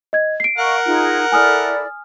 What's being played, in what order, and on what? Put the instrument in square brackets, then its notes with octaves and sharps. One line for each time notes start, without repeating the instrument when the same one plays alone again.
[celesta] D#5 G#6
C7 D7
[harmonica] A#4 F#5 [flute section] D#5 F5 C#6
[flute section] D#4 F4 G#4
[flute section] E4 A4 D5 [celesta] G#5 D#6 F6